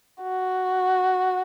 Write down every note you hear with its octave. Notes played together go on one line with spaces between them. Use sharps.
F#4